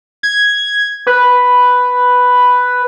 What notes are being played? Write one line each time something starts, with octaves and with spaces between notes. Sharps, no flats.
G#6
B4